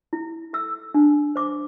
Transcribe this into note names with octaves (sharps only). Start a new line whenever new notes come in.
E4
A4 E6
D4
C5 D6